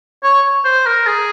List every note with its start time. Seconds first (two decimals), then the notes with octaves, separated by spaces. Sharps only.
0.23 C#5
0.65 C5
0.86 A#4
1.06 G#4